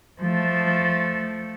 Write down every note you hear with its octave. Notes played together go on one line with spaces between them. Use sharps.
F3 A3